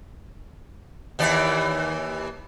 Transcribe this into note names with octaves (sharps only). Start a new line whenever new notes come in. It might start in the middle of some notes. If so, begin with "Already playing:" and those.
D#2 E3 D5